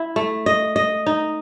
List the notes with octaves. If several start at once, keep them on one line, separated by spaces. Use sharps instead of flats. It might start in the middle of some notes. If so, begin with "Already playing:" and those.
Already playing: E4
A3
D#5
D#5
D#4